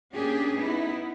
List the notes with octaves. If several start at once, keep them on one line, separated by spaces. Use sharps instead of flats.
A#3 C#4 D4 G4 G#4
B3 D#4 E4